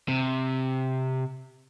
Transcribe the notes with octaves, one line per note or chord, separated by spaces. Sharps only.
C3